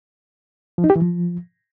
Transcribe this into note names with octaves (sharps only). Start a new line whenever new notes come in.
F3
D#4
G4
E3
F3